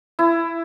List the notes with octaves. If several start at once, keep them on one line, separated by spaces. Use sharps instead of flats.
E4